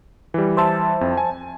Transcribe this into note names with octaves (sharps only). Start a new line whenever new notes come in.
E3 G3
C5 E5 A5
F2
G#5